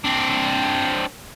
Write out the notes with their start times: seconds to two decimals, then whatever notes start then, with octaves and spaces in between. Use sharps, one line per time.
0.04 C4 D4